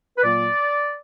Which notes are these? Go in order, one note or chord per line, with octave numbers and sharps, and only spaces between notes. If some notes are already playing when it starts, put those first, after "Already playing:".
B4
A#2 F#3 A#3 D5